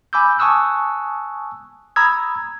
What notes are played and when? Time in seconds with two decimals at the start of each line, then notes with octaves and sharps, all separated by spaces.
0.13 G#5 B5 D6 E6 G6
0.39 G#5 A5 C#6 D#6 E6 F#6
1.96 A#5 B5 D#6 E6 G#6